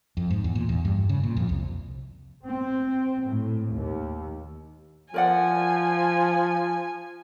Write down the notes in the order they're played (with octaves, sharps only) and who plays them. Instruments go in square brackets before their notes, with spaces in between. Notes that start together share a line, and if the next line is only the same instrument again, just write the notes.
[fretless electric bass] F2
G#2
E2
A#2
E2
G2
C#3
A#2
F2
C2
[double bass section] C4
A2
D#2
[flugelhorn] F3 [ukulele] A#4 D5 F#5 [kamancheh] G#5